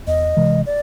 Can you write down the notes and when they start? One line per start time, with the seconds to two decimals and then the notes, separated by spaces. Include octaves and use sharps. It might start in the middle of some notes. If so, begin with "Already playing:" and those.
0.07 E2 D#5
0.37 C3 E3 G#3
0.66 D5